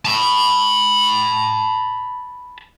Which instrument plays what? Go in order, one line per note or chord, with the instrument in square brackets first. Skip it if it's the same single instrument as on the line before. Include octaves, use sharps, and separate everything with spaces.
[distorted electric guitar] A5 B5